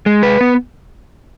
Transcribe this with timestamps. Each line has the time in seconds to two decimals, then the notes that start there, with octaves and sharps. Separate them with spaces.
0.06 G#3
0.23 B4
0.41 B3